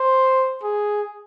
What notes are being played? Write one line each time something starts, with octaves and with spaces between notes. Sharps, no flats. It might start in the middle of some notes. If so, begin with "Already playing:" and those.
Already playing: C5
G#4